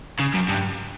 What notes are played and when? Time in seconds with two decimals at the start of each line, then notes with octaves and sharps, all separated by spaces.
0.20 C#3
0.34 F#2
0.49 G2